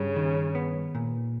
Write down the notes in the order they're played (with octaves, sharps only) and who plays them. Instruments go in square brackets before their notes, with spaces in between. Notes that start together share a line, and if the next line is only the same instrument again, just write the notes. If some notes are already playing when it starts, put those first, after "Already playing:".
Already playing: [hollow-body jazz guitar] G2 G3 [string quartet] C#3
[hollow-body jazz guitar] D#3
B3
A#2